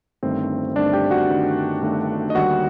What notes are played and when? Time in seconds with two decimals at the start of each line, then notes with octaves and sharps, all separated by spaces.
0.23 G1 G2 D#3 A3 C4 C5
0.76 G1 G2 D#3 A3 D4 D5
0.93 G4 G5
1.11 F#4 F#5
1.29 G1 G2 D#3 A3
1.82 G1 G2 D#3 A3
2.30 D#5
2.35 D#2 D3 G3 F#4 F#5